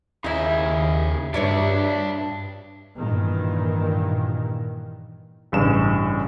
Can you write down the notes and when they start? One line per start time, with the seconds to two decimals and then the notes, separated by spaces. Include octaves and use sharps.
0.24 D#2 C#3 D#4 E4 G#4 E5
1.34 G2 D4 B4 C#5 D5 E5
2.95 G2 A#2 D#3 E3
5.52 A1 G2 C#3 E7